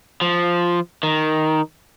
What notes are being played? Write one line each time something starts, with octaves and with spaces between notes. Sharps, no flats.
F3
D#3